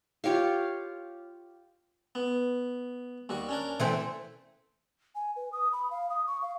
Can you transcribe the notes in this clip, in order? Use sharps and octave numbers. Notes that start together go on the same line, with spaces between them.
F4 G4 C#5 F5
B3
D#2 G3 F#4
C#4 D4 A#4
E3 A3 C4
G#5
B4
D#6
B5
F5
D#6
C#6
F5